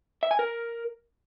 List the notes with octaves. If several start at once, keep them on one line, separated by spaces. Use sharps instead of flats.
E5
G#5
A#4